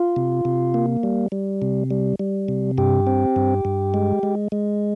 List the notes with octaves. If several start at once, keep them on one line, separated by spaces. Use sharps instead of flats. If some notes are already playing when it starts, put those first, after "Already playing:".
Already playing: F4
C3
C3
A#3
G3
G3
C3
G3
G3
C3
G2 G4
C4
G2
G2
G#3
G#3
G#3